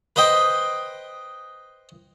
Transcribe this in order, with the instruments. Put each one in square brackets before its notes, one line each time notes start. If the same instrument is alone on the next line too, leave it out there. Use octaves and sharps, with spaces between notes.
[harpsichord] B4 C5 D#5 G5